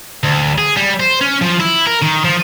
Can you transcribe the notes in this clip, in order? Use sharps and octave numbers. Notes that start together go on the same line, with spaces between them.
D2
G#4
G3
C5
C#4
F3
E4
A#4
D#3
F3